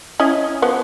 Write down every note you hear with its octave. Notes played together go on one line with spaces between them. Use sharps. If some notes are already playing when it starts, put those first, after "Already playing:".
C#4 E4 D#5
F3 B3